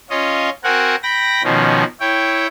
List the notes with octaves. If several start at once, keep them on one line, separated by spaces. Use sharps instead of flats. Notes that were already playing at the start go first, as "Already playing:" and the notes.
C#4 F4 C#5 D#5
C4 F#4 A#4 F#5 G#5
G5 B5 A#6
B2 D#3 F3 C#4
E4 C#5 G5